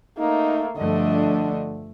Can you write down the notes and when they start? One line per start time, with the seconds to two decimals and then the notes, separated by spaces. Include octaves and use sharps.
0.19 A3 A#3 D#4
0.77 G2 D3 F3 A3 D4 D#5